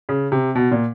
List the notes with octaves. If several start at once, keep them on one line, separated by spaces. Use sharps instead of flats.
C#3
C3
B2
A#2